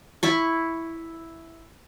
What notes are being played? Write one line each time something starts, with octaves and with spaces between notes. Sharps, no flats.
E4 B5 C#6